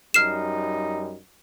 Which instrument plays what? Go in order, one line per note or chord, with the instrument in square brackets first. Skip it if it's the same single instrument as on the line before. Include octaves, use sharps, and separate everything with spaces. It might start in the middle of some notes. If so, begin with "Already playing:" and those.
[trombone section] F#2 G3 D#4 [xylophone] F6 C7 E7